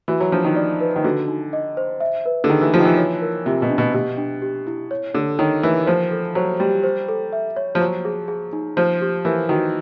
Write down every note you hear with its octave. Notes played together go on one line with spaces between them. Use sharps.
E3 F#4
F#3
F3 D4
D#3
D5
B4
D#3
D3 F#4
D#4
D#5
C5
E5
B4
D3
D#3 G#4
E3
F3 F4
D#3
E3
C#5
A#4
C3 F4
B2
D4
B2
B2 G4
D4
G4
E4
C#5
D3 A4
D#3 C#5
E3 A#4
F3 C5
A4
F#3 C5
G3 G4
C5
A4
E5
C#5
F3
F#3 C5
G#4
G#4
D#4
F3 C5
G4
E3 A#4
D#3 F#4